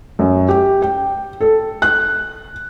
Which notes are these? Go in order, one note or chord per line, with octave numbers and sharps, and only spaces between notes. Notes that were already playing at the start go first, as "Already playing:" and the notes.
F#2
G4
G5
A4
F#6